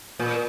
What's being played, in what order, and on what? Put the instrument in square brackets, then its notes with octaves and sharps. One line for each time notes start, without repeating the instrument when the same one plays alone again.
[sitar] A#2